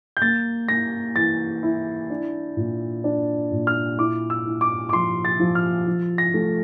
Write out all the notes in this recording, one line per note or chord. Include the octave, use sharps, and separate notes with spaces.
G6
A#3 A6
A#3 A#6
E3 A6
E4
D4
A#2
D4
A#2
F6
E4 D6
E6
E4
D6
D6
F3 C6
A6
F3
F6
F3
A#6
A3